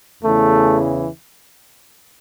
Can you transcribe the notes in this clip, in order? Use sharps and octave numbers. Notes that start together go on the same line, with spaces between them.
E2 C#3 E3 A3